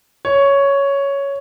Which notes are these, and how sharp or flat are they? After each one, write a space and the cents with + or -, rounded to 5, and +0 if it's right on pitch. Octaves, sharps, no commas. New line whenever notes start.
C#5 +5